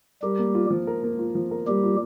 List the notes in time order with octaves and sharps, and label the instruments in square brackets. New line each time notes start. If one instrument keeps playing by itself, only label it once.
[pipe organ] G3 G4 [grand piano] A#4
[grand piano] A#3
F4
F3
A#4
A#3
F4
F3
A#4
[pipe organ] G3 G4 [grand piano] A#3
[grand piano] F4